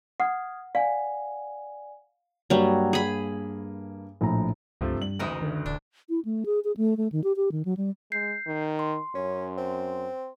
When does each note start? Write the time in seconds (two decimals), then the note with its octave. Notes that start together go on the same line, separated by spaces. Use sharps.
0.20 F#5 D#6 F6 G#6
0.75 D5 F5 F#5 G#5
2.50 G2 F#3 G3 A#3
2.93 G#4 B5
4.21 A#1 A2 A#5
4.81 C#2 G2 C3 F3 A3
5.02 G3 F#7
5.19 F#1 D2 E3 D#4 A#4
5.42 D3 D#3
5.66 D#1 D4
6.09 E4
6.25 A3
6.46 G#4
6.64 G#4
6.77 A3
6.97 A3
7.12 D#3
7.24 G4
7.36 G4
7.52 D#3
7.65 F#3
7.77 G3
8.12 G#3 G6 C7
8.47 D#3
8.79 C6
9.15 F#2 C#4
9.58 C4